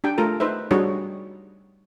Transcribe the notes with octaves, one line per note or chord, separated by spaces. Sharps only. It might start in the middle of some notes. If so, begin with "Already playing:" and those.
D4 G4 G5
A3 F4 A4 A#4 A#5
D#4 B4 C5 E5
G3 D4 D#4 F#4 G#4 C#5